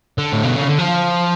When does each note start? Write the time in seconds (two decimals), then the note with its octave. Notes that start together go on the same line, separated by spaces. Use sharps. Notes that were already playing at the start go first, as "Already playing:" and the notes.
0.18 D3
0.33 A2
0.43 B2
0.56 C#3
0.67 D3
0.79 F3